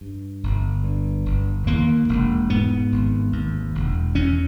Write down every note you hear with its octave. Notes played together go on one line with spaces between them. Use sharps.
G2
G1
G2
G1
D#2 A#3
E1
G#2 B3
G#1
D#2
E1
E2 C#4